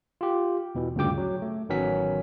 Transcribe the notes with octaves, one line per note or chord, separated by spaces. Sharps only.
F4 G4
E2 B2 E3
D2 G2 A#2 C#3 G5 D6
F#3
A3
A1 D#3 F#3 B3 C#4 B6